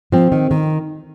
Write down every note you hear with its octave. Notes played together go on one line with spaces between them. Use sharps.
F3 C4
D#3
D#3